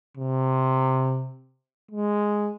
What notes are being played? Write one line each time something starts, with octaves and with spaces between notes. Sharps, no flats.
C3
G#3